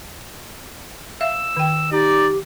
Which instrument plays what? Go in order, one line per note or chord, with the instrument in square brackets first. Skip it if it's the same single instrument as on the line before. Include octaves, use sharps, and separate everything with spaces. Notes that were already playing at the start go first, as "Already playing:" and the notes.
[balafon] E5 F5 [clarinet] E6
[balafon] D#3 G5
[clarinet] D#4 [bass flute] G4 [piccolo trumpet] D5